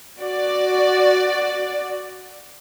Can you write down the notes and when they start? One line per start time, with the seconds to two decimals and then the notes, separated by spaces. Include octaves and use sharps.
0.21 F#4 D5